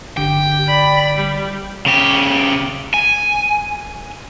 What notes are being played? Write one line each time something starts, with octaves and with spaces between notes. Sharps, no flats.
G1 D3 G4 G5 D6
D5 B5
G3
C#3 G4
G#5